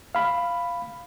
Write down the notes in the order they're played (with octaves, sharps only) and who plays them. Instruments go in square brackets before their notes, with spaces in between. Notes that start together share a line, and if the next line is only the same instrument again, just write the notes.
[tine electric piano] F5 B5